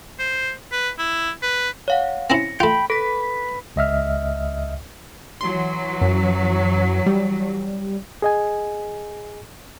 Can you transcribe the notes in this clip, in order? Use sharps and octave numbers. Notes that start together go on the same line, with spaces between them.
C5
B4
E4
B4
C#5 F5 F#5
C4 C#4 E4 A#6 C#7
A3 F4 G5 B5
A4 B4 B6
C#2 D#5 E5 F6
E3 F#3 C6
F#2
G3
G#4 D#5 G#5